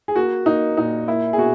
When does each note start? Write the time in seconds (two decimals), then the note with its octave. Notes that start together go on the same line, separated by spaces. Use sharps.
0.08 G#4
0.16 A#3 F#4
0.46 A#3 D#4
0.77 A#2 D#4
1.08 A#3 E4
1.33 G#4
1.38 B2 F#4